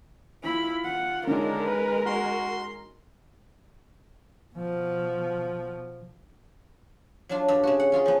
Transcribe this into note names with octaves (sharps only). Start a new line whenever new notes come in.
E4 F4 B5
F#5
D3 G#3 C#4 D#4 A#4
B4
F#4 C6
B2 F3
F#3 D4 F4
G2
C#3 F#4
F#5
C#4 F4 G#4 A#4
F3 B3